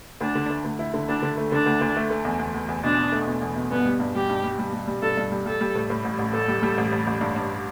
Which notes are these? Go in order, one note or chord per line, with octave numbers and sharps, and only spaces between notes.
D2 D4
D3
A3
D2
E4
D3
D2 D4
D3
A3
D3 D4
D2
D2
A3
A3
E2
E2
E2
E2
B2 D4
E2
A3
B2
E2
B2
G2 B3
G3
G2
G3 G4
G2
G3
G3
G3
G3
G2 A4
G2
G3
G3 A4
G3
A2
A2
A1
A1
A2 A4
G3
G3
A1
A1
A1
G2
G2